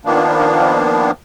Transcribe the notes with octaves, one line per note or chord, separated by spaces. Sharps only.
D#3 F3 A#3 B3 D4